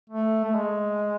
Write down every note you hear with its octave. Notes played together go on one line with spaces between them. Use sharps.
A3
A3
G#3